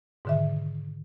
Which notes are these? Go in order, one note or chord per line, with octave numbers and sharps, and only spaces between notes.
G#2 B2 D3 D#3 E5